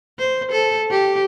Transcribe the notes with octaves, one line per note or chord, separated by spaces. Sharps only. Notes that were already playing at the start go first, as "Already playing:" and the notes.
C5
A4
G4